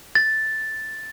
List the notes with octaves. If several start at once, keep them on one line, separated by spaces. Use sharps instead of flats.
A6